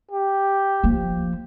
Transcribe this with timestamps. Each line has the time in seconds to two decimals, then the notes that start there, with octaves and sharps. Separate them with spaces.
0.11 G4
0.83 F3 A#3